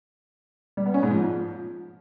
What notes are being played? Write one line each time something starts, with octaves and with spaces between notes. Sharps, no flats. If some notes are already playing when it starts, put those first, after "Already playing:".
G3
B3
C#4
G#2
F3